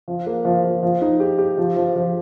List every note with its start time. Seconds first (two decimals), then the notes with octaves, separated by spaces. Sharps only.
0.08 F3
0.26 A#3
0.45 F3
0.64 F3
0.83 F3
1.02 D#4
1.20 G4
1.38 G4
1.58 F3
1.76 F3
1.96 F3